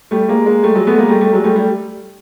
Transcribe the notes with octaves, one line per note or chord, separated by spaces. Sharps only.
G3 A3
G#3 A#3
G#3 A#3
G3 A3
F#3 G#3
A3 B3
G#3 A#3
G3 A3
G3 A3
F#3 G#3
G3 A3
G3 A3